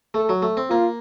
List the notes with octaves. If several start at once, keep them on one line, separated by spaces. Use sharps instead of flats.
A3 A4
F#3
A3
C4
A#3 F4